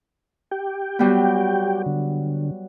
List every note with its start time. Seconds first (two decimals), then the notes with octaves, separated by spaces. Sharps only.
0.51 G4 G5
0.99 F#3 G3 B3
1.86 D3